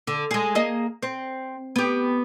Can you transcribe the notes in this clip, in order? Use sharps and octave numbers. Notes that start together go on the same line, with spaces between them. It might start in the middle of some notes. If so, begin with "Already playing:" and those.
D3
G#3 G#4
A#3 G#4 D#5
C4
B3 G4